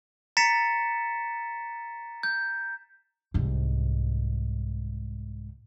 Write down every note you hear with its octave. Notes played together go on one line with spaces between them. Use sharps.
A#5 A6 B6 C#7 E7
G6
C2 G#2